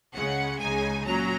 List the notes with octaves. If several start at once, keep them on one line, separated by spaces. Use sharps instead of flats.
C#2 C#3 G#3 C#4 F#5
C#2 C#3 G#3 D#4 G#5
A#2 F#3 C#4 A#5